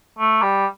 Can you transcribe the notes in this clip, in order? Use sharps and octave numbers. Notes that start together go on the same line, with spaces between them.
A3
G3